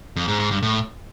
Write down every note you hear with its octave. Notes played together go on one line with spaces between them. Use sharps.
F2
G#2
G#2
G2
A2